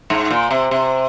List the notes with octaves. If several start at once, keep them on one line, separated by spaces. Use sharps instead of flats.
G#2
A#2
C3
C3